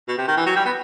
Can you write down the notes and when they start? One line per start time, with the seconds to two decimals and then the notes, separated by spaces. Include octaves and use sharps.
0.08 B2
0.18 C3
0.28 D#3
0.37 E3
0.46 F#3
0.56 G3
0.66 B3